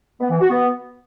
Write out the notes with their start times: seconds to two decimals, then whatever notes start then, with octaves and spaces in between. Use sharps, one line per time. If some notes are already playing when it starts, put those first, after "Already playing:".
0.20 B3
0.30 E3
0.40 F#4
0.50 B3